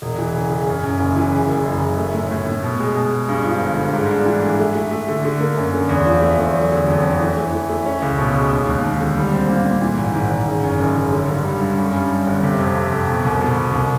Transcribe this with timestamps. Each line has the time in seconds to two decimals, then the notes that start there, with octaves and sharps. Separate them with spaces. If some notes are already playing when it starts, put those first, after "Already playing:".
0.02 E1
0.19 E3
0.35 C#3
0.51 C#3
0.67 F#2
0.84 F#2
0.99 F#1
1.16 E3
1.32 C#3
1.48 F#1
1.65 F#1
1.82 F#1
1.98 A3
2.14 A2
2.31 A2
2.46 A2
2.63 B2
2.80 G#3
2.96 B2
3.12 G#3
3.29 G2
3.45 F3
3.60 G1
3.77 G2
3.93 G#2
4.11 D4
4.26 E3
4.43 A3
4.59 A3
4.75 A3
4.91 A3
5.08 D3
5.25 D3
5.41 A#3
5.57 F#2
5.73 D3
5.89 E2
6.06 F3
6.22 A3
6.38 E2
6.55 F#3
6.72 D3
6.88 F2
7.04 F2
7.21 E3
7.37 A3
7.52 E3
7.69 A3
7.86 C#4
8.02 C#2
8.18 B2
8.34 G#3
8.51 D#2
8.67 D#2
8.84 D#2
9.00 D3
9.17 G3
9.33 C4
9.49 A#2
9.65 A#2
9.82 E3
9.98 G#1
10.15 G#1
10.31 G#1
10.47 C#3
10.63 F#2
10.79 F#1
10.96 F#1
11.12 D3
11.29 G2
11.45 G3
11.61 G2
11.78 F#2
11.93 G3
12.11 G3
12.27 G1
12.43 C3
12.59 F2
12.76 C3
12.92 F2
13.08 B2
13.25 C2
13.41 B2
13.57 C2
13.73 C2